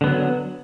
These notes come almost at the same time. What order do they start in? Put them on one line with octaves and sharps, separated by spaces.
D3 B3 F#3